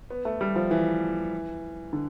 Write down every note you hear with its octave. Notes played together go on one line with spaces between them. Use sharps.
B3
A3
G3
F3
E3
D3